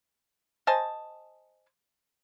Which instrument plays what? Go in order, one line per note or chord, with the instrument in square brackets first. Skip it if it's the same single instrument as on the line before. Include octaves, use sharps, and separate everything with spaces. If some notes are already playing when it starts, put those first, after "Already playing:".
[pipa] C5 D#5 G#5 A5